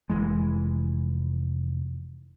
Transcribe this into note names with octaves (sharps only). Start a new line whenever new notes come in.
F1 C2 E3 G#3